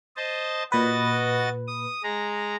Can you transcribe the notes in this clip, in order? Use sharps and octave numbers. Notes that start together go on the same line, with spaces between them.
C5 D#5 A5
A#2 F#4 B4 D#5 A6
D#6
G#3 A#5